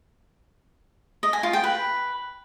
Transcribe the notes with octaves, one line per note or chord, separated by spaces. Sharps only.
D#5
G#5
F4
G5
B4